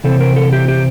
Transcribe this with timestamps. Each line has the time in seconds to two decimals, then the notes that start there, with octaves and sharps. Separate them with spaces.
0.04 C3 E3 C4 A4
0.20 A#4
0.36 A4
0.53 G4
0.68 G4